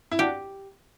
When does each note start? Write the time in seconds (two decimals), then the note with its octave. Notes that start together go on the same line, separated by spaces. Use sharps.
0.12 E4
0.19 D4 F#4 G4